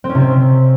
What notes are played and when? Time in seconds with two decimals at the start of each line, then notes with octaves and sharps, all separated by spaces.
0.04 C4
0.09 C#4
0.15 C3
0.20 C4